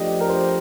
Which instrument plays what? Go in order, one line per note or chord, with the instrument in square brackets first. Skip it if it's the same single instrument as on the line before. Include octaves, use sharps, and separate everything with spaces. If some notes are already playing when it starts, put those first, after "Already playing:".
Already playing: [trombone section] F3 A3 D4 G4 [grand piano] D#5
[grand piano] A#4
C5